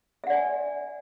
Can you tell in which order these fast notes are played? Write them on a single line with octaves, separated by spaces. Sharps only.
E5 F#5 D5 G#5